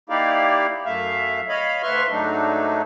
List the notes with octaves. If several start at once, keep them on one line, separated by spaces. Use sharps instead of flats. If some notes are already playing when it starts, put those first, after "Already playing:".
A#3 D#4 E4 G4 D5 F5
F#2 A3 E5 F5
C#5 D#5 F5 B5
D2 B4 E5 C6 C#6 F6
G#2 F#3 A3 D4 D#4